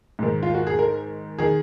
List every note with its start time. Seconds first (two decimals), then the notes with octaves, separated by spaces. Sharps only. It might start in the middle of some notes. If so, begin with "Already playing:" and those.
0.19 G#2 D#3
0.43 F4
0.54 F#4
0.67 G#4
0.79 A#4
1.39 D#3 G#4